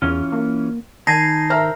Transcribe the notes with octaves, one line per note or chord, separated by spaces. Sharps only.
E2 E3 C#4 F4
A#3
D#3 D#4 G#5 A5 B5 A#6 C7
A#4 C5 E5 A#5 F6